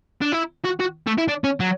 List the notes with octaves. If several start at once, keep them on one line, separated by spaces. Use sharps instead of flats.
D4
E4
F#4
F#4
A3
E4
D4
C#4
F#3